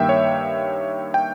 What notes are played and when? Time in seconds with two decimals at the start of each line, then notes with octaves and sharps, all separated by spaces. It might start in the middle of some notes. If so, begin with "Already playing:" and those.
Already playing: G2 D#3 A#3 E5 G5
0.09 C#5
1.14 G5